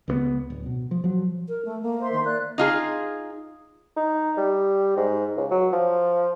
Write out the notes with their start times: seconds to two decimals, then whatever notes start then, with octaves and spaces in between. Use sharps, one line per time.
0.08 C#2 G3 B3
0.50 D1
0.66 B2
0.91 F3
1.04 F3 F#3
1.48 A#4
1.65 A3
1.83 A#3
2.00 C5 E5 C6
2.12 D#3
2.24 A#3 D5 F#6
2.58 D#4 F4 G#4
3.97 D#4
4.37 G3
4.97 G#2
5.37 C#2
5.51 F#3
5.73 F3